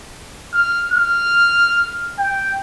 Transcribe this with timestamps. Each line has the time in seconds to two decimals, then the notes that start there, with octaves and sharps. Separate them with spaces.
0.54 F6
0.92 F6
2.19 G5